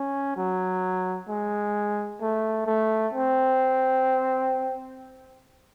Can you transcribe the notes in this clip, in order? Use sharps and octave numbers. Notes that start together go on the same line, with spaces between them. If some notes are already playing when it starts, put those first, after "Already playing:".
Already playing: C#4
F#3
G#3
A3
A3
C4